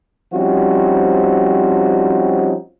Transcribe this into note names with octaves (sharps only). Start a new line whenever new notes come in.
F3 G3 C4 C#4 D#4 F#4